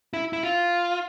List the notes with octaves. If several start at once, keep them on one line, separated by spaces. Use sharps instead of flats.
E4
E4
F4